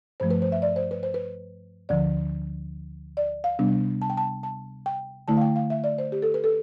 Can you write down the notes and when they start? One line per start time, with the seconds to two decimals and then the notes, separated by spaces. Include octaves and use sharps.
0.20 G2 F3 A3 C5
0.31 B4
0.42 C5
0.52 E5
0.62 D5
0.76 C5
0.91 B4
1.03 C5
1.14 B4
1.89 D2 D3 F3 D5
3.17 D5
3.44 F5
3.59 C3 G3 B3 D4
4.02 A5
4.10 G5
4.17 A5
4.43 A5
4.86 G5
5.28 D3 A3 E4 A5
5.37 F5
5.41 G5
5.56 F5
5.70 E5
5.84 D5
5.98 C5
6.12 G4
6.22 A4
6.34 B4
6.44 A4